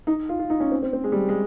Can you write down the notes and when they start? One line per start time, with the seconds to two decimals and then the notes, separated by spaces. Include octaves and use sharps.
0.07 D#4
0.29 F4
0.39 F4
0.50 D#4
0.60 C#4
0.71 C4
0.82 C4
0.93 C4
1.04 G#3
1.12 G3
1.29 G#3